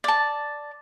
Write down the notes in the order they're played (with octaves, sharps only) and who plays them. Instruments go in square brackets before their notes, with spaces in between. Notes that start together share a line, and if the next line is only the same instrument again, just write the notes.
[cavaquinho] D5 A5